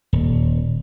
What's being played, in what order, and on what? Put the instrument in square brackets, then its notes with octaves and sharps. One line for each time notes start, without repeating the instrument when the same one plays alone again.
[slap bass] D#1